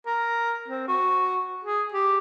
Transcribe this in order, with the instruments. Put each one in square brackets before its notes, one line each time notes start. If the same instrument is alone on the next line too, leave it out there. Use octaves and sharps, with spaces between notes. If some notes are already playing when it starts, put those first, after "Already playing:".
[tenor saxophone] A#4
C4
F#4
G#4
G4